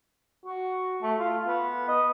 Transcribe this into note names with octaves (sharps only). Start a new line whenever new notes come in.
F#4
A3
F4
B3
D#5